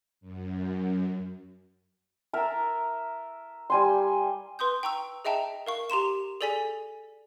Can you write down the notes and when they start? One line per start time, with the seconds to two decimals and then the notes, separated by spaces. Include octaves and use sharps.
0.21 F#2
2.33 A#4 E5 A5 A#5
3.70 G3 G#5 C6
4.59 B4 C6 D#6 G6
4.83 G5 A#5 C#6 E6
5.25 G#4 D#5 E5 G5 A5 A#5
5.67 A#4 F5 C#6
5.90 G4 A#5 C6 E7
6.41 G#4 A4 D5 G#5 B6